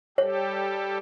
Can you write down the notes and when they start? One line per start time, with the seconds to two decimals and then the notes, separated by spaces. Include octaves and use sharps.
0.18 G3 G4 A4 C#5